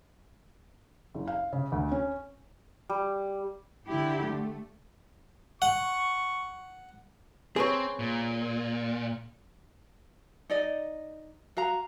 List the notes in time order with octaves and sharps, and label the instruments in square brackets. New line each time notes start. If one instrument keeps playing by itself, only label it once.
[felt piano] F#1
F5
C#3
D2
C#4
[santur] G3
[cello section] D3 E4 G4
A3
[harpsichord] F#5 [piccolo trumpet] C#6
[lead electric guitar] C4 [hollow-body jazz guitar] G#4 B4 C#5
[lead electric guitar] A#2
[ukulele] D#4 D5 D#5
F#4 F5 A#5